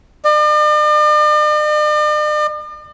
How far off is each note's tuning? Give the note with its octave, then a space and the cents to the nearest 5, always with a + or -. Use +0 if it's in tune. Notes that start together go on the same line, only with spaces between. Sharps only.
D5 +45